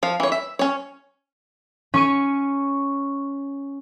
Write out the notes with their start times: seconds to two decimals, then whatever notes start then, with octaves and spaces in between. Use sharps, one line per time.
0.03 F3 F5
0.20 E3 C#5
0.32 E5
0.59 C#4 C#5
1.94 C#4 C#6 D#7